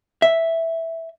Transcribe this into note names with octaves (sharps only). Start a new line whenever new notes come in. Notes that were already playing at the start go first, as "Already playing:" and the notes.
E5